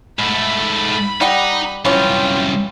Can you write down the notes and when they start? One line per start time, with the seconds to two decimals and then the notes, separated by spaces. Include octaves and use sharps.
0.19 G#2 A3 B5
1.21 G3 D#4 G4 F#5
1.85 C2 F#2 E3 C#4 F4 G5